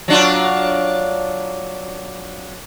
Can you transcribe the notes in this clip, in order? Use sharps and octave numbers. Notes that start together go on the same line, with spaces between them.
F#3 D4 F4